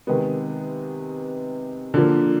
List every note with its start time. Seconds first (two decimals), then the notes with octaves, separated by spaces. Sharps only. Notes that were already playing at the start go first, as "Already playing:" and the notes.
0.07 C3 D#3 G#3 B3
1.94 D3 F3 A#3